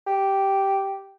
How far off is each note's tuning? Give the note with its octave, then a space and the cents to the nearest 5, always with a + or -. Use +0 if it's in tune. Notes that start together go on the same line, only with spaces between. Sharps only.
G4 -5